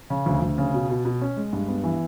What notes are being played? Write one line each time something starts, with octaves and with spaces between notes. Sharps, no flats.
C#3
D2
D2
C#3
B2
B2
B2
C#4
G#3
G2
B3
E3